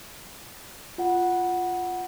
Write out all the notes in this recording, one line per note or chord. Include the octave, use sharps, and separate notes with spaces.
F4 F#5